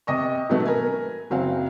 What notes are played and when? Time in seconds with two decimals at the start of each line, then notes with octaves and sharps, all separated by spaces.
0.07 C3 D#5 C#6
0.49 B2 D#3 F#3 A3 B3
0.65 A#4 B4 G#5
1.30 F#1 F#3 C4 F5